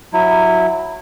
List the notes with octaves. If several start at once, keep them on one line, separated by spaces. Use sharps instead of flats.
F#3 E4